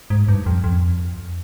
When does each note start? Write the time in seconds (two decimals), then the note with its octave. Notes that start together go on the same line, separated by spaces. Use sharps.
0.10 G#2
0.28 G2
0.46 F2
0.64 F2